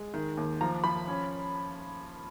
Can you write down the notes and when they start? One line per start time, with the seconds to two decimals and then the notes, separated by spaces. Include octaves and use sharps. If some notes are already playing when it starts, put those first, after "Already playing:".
Already playing: G#3
0.14 D#3
0.37 D#2
0.61 F3 A#5
0.84 F3 B5
1.08 C#4